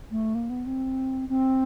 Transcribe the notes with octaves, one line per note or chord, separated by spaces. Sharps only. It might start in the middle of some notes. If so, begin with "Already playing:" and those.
A3
A#3
B3
C4
C4